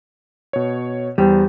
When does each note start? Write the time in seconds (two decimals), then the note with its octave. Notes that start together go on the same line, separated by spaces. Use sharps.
0.53 B2 C#5
1.18 E2 G3 C5